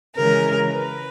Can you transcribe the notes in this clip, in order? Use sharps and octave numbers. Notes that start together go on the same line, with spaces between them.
C#3 E3 G#3 C#4 A#4
B4